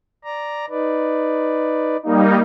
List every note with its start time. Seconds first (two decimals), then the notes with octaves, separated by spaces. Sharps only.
0.24 D5 A#5
0.70 D#4 B4 D5
2.03 G3 A#3 D#4